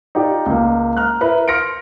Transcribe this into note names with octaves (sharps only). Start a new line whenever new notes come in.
D#4 F4 G4 D5
C#2 A#3
A#5 F6 F#6
E4 A#4 B4 A#5
C6 F6 A#6 C#7 D7